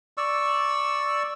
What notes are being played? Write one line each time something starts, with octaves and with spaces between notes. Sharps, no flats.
D5 C#6 E6